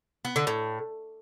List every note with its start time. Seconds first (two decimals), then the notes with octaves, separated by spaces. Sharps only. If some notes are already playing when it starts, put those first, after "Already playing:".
0.25 B3
0.36 D3
0.47 A2